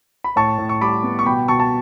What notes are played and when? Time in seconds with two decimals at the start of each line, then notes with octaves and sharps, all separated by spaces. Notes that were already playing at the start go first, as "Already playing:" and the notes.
0.24 B5
0.36 A2 A5 C#6
0.58 A2
0.69 C#6
0.81 G3 B5 D6
1.03 B3
1.19 C#6
1.26 B2 G5 B5
1.48 B2 A5 C#6
1.60 A5